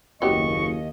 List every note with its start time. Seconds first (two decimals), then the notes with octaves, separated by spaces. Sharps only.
0.22 F#1 D#2 F#3 B3 G4 D#5 C#6